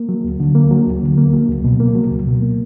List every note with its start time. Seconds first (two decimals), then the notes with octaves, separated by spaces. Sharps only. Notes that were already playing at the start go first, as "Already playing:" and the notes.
Already playing: A#3
0.09 F#3
0.24 D2
0.40 D3
0.55 A#3
0.71 F#3
0.87 D2
1.02 D3
1.18 A#3
1.33 F#3
1.49 C#2
1.64 B2
1.80 A#3
1.95 F#3
2.11 C#2
2.27 B2
2.42 A#3